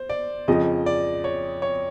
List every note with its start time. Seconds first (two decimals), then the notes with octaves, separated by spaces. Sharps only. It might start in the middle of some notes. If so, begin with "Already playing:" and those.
Already playing: C5
0.09 D5
0.48 F2 C#3 F3 D#5
0.86 D5
1.24 C#5
1.62 C#5